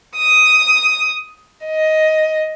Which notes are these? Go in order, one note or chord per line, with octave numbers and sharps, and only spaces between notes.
D#6
D#5